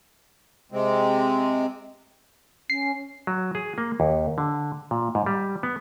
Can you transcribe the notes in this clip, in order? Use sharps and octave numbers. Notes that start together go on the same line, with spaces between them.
C3 G#3 C4
C#4 C7
F#3
G#4
A#3
D#2
D3
A#2
G#2
G3
B3